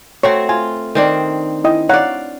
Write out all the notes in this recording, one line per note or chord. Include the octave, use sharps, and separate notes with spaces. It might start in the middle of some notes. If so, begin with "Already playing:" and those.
A3 C4 F#4 C#5
F4 G#5
D#3 C4 D4
E4 D#5 G5
C#5 D5 F5 F#5 A#5